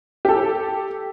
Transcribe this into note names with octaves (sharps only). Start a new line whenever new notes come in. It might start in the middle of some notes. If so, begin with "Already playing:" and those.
G4 A4